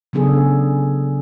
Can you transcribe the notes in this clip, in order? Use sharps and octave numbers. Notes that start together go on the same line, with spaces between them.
C#3 F#3 B3 D4 G#4 A4